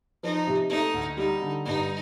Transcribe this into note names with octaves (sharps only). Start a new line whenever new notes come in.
F3 D#4
C3
A3 D#4
D2
G3 D#4
D3
G2 D#4